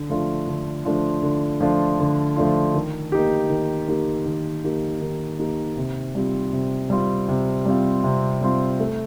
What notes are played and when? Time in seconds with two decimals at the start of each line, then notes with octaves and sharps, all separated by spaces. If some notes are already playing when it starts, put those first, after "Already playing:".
Already playing: D3
0.10 F3 A3 D4 F4
0.47 D3
0.85 F3 A3 D4 F4
1.23 D3
1.60 F3 A3 D4 F4
1.99 D3
2.36 F3 A3 D4 F4
2.75 D#3
3.12 A#3 D#4 G4
3.50 D#3
3.88 A#3 D#4 G4
4.26 D#3
4.64 A#3 D#4 G4
5.01 D#3
5.39 A#3 D#4 G4
5.77 C3
6.15 G3 C4 F4
6.53 C3
6.90 G3 C4 F4
7.28 C3
7.65 G3 C4 F4
8.04 C3
8.41 G3 C4 F4
8.80 A3